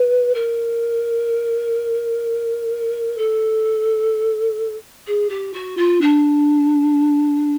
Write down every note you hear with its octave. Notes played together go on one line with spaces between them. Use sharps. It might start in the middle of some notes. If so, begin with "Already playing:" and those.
Already playing: B4
A#4
A4
G#4
G4
F#4
F4
D4